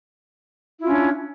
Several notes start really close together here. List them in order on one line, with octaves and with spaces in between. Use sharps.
E4 F4 C#4 D4